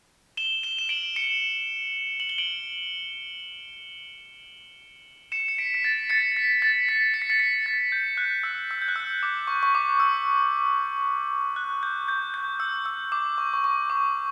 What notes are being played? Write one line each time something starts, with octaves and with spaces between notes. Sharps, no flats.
E7 G7
E7 G7
E7
D7 F#7
C#7 E7
F#7
G7
D7 F#7
C#7 E7
C#7
B6 D7
B6
A6
A6 C#7
B6
A6
B6
C#7
B6
A6 C#7
B6
A6
G6
F#6
E6
E6
G6
F#6
E6
D6
C#6
C#6
D6
E6
F#6
G6
G6
G6
E6
E6
D6
C#6
C#6
C#6
D6